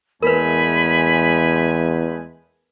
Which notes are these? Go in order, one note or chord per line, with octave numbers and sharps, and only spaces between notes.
E2 G#3 A3 A#4 B4 G#5 B5